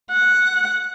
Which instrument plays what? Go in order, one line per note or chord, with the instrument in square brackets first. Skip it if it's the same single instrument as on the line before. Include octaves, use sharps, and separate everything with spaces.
[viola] F#5